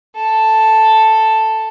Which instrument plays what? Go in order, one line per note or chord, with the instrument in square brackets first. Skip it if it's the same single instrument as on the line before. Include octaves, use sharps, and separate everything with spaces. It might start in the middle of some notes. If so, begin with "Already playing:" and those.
[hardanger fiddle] A4